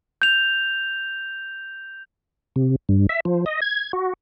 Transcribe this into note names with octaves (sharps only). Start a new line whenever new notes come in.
G6 F7
C3
G2
E5
F3
D#5
G#6
F#4